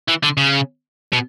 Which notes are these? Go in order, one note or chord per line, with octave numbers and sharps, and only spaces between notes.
E3
D3
C#3
B2